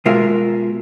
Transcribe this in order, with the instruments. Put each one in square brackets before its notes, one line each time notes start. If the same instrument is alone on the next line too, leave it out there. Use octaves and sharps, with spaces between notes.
[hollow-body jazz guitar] B2 G#3 F4 A#4 E5